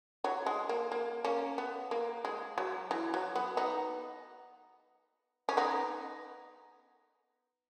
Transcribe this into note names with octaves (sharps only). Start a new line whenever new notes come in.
F#3
G#3
A#3
A#3
A#3 C#4
B3
A#3
G#3
F#3
E3
F#3
B3
B3 D#4
C#4
B3 D#4